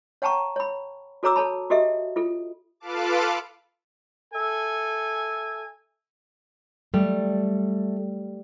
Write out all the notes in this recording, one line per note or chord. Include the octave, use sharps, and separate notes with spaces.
C#5 F#5 G5 A5 A#5 C#6
C#5 B5
F#4 A4 C#5 A#5 D6 E6
A4 C#5 A5 B5
F#4 G4 A4 D#5 E5
F4 A4
F4 A4 B4 F5 A5 D6
A4 E5 G#5
G3 A3